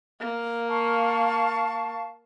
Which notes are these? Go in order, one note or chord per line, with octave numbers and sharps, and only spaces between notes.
A#3
F5 A5 C#6